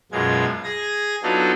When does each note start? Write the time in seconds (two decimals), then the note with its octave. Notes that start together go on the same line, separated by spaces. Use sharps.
0.12 F#2 B2 G#3 F4 G#6
0.64 G#4 G#6 A#6
1.23 F#3 B3 D4 D#4 F4 A4